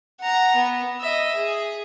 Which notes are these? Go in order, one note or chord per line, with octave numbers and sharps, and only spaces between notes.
F#5 A#5
B3
D#5 E5
G#4